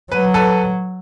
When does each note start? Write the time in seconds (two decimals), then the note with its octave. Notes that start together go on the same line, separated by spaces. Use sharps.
0.12 F#3 B4
0.34 A4 B4